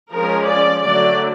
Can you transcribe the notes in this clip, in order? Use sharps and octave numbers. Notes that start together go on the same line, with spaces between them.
F3 G#3 C#4 A#4
D5
D3 F#3 A3 D5